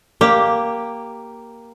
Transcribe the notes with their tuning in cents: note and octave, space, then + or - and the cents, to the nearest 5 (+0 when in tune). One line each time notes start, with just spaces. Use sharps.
A#3 +0 G4 +0